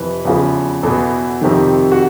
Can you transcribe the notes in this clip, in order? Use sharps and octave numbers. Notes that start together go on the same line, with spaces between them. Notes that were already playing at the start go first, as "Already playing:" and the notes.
Already playing: F2 C3 E3 B4
E2 C#3 F3
E2 B2 A4
F2 C3 D#3
F#4